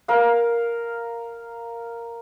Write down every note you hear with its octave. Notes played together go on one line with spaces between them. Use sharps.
A#4 F5